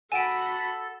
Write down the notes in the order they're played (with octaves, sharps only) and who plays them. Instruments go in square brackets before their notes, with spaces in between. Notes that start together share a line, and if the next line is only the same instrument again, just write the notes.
[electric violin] F#4 B5 [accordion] A4 [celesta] F#5 E7 [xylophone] G#5 D7